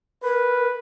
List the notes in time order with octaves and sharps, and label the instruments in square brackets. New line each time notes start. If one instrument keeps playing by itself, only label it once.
[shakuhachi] A#4 [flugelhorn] B4